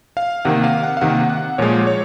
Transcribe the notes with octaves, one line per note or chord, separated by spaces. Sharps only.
F5
C3 D#3 A#3 F#5
F5
F#5
F5
C3 D#3 A#3 F#5
F#5
A#2 F3 G#3 C#5
C#5